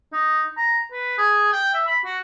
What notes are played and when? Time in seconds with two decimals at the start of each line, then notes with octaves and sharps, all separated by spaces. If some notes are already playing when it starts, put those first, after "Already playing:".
0.13 D#4
0.57 A#5
0.92 B4
1.18 G#4
1.53 G5
1.74 E5
1.87 B5
2.05 F#4